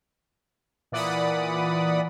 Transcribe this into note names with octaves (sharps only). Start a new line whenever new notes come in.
A#2 E3 D5 F#5 B5 D#6